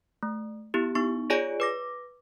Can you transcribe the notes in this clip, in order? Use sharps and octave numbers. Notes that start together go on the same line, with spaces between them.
A3
B3 E4 G4
B3 D#4 C#6
F4 G#4 C#5 D5 G#5 D7
B4 D6 A#6